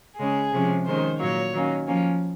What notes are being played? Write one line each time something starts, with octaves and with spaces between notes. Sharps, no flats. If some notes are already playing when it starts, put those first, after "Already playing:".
C#3 G#3 C#4 G#4
C3 F3 G#3 C#4
D#3 G#3 C#4 C5
A#2 F#3 A#3 C#5
D#3 F#3 A#3 C#4
F3 A#3 C#4